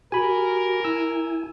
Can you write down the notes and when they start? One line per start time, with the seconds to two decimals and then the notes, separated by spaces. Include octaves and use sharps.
0.12 F#4 G4 A#4 G#5 B5
0.85 E4 G#5 E6